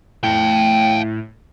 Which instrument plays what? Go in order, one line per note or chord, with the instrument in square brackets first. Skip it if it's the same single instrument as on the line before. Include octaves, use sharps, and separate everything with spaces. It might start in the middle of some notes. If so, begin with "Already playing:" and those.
[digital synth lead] A2 [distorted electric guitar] F5 G5